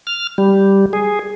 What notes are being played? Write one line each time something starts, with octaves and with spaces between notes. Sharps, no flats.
F6
G3
G#4